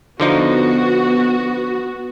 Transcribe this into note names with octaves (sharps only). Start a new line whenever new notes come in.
D3 F3 B3 D#4 F#4